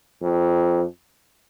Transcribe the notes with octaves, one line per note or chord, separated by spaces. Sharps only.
F2